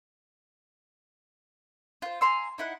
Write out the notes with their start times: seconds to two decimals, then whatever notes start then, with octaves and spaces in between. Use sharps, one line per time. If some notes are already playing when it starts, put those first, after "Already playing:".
2.02 F4 C5
2.21 G#5 A#5 C6 E6
2.58 D#4 E4 F#5